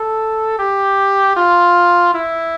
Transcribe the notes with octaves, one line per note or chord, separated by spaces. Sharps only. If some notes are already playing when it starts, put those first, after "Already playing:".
Already playing: A4
G4
F4
E4